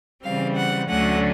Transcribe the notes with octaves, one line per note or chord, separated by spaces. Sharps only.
C#3 E3 G3 C4 F5
F#5
D2 D3 F#3 A3 C#4 F#5